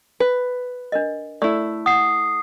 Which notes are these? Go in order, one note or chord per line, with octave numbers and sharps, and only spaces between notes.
B4
D4 A#4 D#5
A3 E4 D5
F#5 D#6 C7